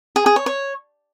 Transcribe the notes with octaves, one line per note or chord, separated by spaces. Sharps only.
G#4
G#4
C#5
C#5